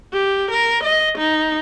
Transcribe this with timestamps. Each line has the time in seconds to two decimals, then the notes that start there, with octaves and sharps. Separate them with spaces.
0.13 G4
0.51 A#4
0.84 D#5
1.18 D#4